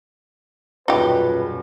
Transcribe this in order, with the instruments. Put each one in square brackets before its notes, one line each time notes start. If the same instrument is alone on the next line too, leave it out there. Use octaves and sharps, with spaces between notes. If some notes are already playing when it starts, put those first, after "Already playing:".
[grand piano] D#1 F#2 B2 [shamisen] D#4 G4 [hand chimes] F4 G#4 [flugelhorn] B4